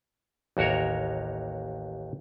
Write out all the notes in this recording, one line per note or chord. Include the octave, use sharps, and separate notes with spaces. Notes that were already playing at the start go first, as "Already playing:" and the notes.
A1 D#2 F#4 A#4 C#5